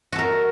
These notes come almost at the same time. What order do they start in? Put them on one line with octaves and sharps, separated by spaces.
F#4 A4 A#4